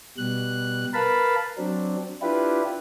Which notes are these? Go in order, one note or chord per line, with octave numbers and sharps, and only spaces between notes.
B2 G3 F#6
A#4 B4 F5 A5 B5
F#3 C4 D4
D4 E4 F4 G4 B4